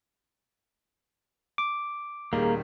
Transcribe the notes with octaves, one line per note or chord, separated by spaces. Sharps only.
D6
D#1 D#3 G3 A#3 G#4 A#5